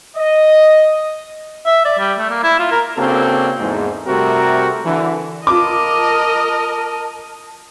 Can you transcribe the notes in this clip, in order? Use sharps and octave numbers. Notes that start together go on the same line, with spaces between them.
D#5
E5
D5
G3
A3
A#3
E4
F4
A#4
C#3 A#3 C4 D4 F#4 A4
E2 G#2
C3 G3 A3 C4 F#4 A#4
D3 E3
F4 A#4 D#5 A5 D6